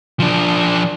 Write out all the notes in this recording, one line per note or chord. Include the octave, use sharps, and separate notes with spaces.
F3 D4